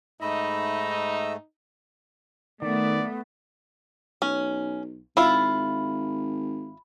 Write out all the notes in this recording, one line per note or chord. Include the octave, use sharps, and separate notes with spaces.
G#2 A3 D#4 D#5 E5 B5
D#3 A3 B3 D5
B1 C#4
G#1 E4 F4 B5